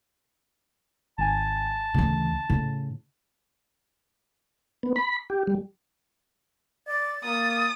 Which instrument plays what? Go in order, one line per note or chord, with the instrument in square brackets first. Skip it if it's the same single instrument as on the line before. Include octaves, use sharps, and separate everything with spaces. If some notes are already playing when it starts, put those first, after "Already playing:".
[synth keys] G#1 G#5 [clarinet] A5
[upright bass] D2 E3 [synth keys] C#3
[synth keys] A2 [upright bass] C#3
[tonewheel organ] B3
B5
G4
G3
[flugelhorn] D5 [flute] A6
[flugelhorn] A#3 [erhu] D#6